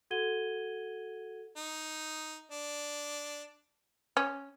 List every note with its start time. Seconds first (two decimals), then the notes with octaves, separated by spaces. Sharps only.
0.10 F#4 A4 F#5 G#6 D#7 G7
1.56 D#4
2.51 D4
4.17 C#4